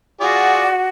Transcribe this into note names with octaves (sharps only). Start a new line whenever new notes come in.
F4 F#4 G#4 D5